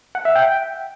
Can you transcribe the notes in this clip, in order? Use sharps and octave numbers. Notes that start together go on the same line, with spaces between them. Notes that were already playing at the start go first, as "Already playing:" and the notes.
F#5
E5
G5